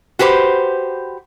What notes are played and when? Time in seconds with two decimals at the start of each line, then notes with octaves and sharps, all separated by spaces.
0.19 F#4 G4 B4 C5